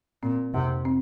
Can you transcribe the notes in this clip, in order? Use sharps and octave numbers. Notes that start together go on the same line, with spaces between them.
A#2 C4
F2 C3
C4